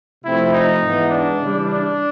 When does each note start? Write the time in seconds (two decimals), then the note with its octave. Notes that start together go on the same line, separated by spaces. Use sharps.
0.24 C3 F3 A3 C4 E4
0.53 D#4
0.81 G#2 E3 G#3 B3
1.09 D4
1.37 C#3 E3 G3
1.66 D4